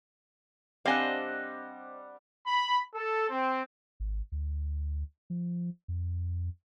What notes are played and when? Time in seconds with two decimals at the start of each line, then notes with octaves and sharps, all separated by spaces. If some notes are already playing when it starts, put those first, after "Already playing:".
0.86 G3 C4 D4 C5 D#5 F5 F#5 G#5
2.47 B5
2.94 A4
3.29 C4
4.00 G#1
4.32 D2
5.30 F3
5.88 F2